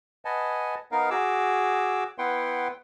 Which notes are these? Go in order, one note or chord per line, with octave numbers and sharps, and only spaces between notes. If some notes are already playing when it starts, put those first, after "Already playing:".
B4 D#5 F#5 G#5 A5
B3 D#4 A#4 F5
F#4 G#4 D6 E6
B3 E4 B4 F#5 G5 C6